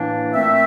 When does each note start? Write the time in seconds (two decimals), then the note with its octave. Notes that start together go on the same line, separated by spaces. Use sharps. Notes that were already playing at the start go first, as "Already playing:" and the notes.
Already playing: A2 E3 A#3 D4
0.34 A#2 A3 C4 E5